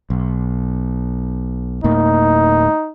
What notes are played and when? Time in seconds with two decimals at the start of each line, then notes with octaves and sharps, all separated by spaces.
0.10 B1
1.84 D1 A2 A#3 D#4